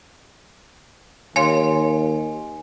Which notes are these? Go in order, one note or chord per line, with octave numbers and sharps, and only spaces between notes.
D#2 C#5 F5 G#5 C6